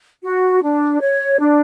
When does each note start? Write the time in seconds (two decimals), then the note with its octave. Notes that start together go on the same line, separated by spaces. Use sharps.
0.23 F#4
0.62 D4
1.00 C#5
1.39 D4